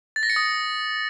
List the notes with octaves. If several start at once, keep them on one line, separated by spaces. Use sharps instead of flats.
A6
A#6
C#7
D#6